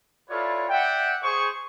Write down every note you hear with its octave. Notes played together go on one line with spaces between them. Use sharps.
E4 F4 A4 B4 C#5 D5
D5 E5 F#5 G5
G#4 C5 C#6